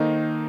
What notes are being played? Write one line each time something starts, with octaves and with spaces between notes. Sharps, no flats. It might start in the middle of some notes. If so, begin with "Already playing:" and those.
Already playing: D#3 A#3 D#4 A4 C5